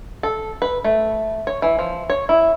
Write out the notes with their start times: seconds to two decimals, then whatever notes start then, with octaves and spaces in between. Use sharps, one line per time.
0.23 A4
0.62 B4
0.84 A3
1.47 C#5
1.62 E3
1.79 F3
2.10 C#5
2.29 E4